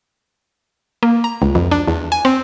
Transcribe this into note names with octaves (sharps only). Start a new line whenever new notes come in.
A#3
A#5
C#2
F2
D4
E2
G#5
C4